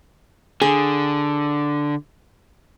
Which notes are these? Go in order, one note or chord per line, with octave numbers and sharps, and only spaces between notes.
D3 G#4